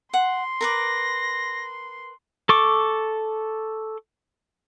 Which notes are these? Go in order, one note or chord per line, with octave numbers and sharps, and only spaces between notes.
F#5 C6
A#4 B4 D6 A#6
A4 C#6 D6